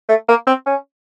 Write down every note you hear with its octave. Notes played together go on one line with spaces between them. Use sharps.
A3
A#3
C4
C#4